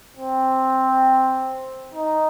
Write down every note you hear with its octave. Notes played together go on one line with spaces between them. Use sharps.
C4
D#4